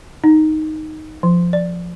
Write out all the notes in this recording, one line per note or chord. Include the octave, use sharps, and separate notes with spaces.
D#4
F3
D5